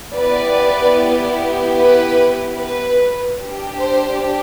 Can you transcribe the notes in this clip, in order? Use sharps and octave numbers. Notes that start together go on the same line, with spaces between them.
B3 E4 G4 B4 D5
B4
B4
D4 G4
C5